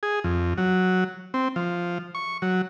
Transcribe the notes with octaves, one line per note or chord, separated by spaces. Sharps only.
G#4
F2
F#3
C4
F3
C#6
F#3